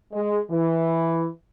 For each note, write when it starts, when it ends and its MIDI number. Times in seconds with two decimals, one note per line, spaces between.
0.13 0.38 56
0.51 1.28 52